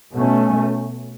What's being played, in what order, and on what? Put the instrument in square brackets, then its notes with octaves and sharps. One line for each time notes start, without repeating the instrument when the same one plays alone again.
[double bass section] B2 A3 C#4